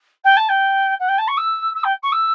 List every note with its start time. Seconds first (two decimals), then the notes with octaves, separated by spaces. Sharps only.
0.24 G5
0.36 A5
0.49 G5
0.99 F#5
1.08 G5
1.18 A5
1.28 C#6
1.37 E6
1.75 E6
1.84 G5
2.03 C#6
2.12 E6